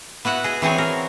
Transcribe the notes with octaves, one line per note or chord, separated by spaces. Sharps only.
B3 E4 F#4 F#5
G#4 D#5
E3 C4 G#4 C#5
A#4